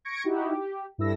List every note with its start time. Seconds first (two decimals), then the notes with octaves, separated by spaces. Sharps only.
0.05 C#6 G#6 A#6 C#7 D7
0.24 D#4 E4 F#4 G4
0.53 G4
0.98 G2 E4 A4 E6 A#6